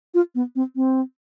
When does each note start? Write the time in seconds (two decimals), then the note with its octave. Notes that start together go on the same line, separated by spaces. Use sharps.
0.14 F4
0.35 B3
0.56 C4
0.76 C4